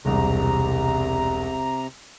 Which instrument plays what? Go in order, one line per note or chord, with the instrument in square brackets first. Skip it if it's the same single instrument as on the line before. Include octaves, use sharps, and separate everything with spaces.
[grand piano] E1 C2 [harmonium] C3 A#5